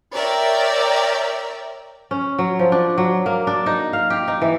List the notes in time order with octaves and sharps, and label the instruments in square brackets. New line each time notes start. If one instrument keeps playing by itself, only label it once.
[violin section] A#4 C#5 D5 E5 G5 A#5
[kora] C#4
F#3
F3
D4
F#3
A#3
D4
D#4
F5
G4
D#4
E3